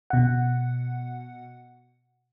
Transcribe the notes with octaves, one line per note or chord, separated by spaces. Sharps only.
B2 F#5